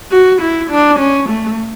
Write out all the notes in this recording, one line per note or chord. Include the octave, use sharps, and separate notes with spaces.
F#4
E4
D4
C#4
A3